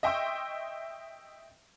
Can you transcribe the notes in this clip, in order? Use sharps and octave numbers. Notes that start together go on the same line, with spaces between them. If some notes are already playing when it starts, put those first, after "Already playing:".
D#5 E5 G5 C6 C#6 E6